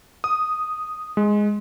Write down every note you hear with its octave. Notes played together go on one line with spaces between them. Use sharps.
D#6
G#3